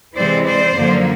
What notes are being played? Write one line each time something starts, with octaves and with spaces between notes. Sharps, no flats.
C3 E3 G#3 C4 C5 D5
C5 D5
F#2 D3 F3 A#3